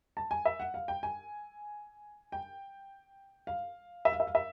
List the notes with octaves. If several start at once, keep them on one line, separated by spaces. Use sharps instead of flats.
A5
G#5
E5
F#5
F5
G5
G#5
G5
F5
E5
F5
E5
F5
E5